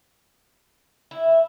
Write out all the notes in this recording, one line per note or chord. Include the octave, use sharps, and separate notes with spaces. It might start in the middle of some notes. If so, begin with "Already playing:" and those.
E4